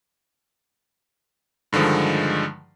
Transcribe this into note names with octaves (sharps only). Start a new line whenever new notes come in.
G2 D3 D#3 F3 G#3